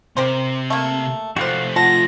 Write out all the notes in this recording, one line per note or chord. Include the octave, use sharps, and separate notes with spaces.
C3 G4 A#4 C5
A3 A#3
F3 G3 A3 F#4 C5 F5 F#6
F4 F#5 A5 A#6